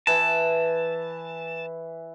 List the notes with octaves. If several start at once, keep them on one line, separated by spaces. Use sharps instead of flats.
E3 A5